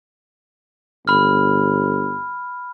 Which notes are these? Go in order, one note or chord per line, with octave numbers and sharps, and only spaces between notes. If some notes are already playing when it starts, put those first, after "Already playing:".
G1 B5 F6